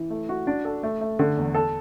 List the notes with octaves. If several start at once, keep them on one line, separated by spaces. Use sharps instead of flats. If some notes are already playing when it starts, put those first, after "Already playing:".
Already playing: E3
A3
F#4
D4
A4
A3
A3
D3
E2
A4